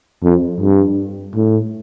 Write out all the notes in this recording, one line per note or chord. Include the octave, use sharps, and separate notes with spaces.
F2
G2
A2